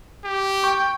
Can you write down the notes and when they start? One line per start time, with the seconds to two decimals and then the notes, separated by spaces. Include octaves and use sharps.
0.25 G4
0.64 G5 C#6